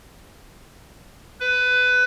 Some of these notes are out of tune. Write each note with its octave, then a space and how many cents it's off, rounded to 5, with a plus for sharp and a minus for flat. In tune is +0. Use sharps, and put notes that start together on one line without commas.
B4 +20